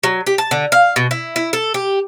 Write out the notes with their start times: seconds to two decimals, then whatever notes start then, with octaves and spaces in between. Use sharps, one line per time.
0.04 F#3
0.27 G4
0.38 A5
0.51 D3
0.72 F5
0.96 B2
1.11 E4
1.36 E4
1.53 A4
1.74 G4